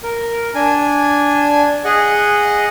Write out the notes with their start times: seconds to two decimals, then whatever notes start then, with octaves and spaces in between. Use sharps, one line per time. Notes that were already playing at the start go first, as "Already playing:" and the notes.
0.03 A#4
0.55 D4 G#5
1.85 G#4 D#5 F#5